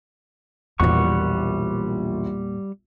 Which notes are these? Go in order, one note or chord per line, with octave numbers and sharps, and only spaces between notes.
E1 A#1 E2 A#2 G3 F#5 C#6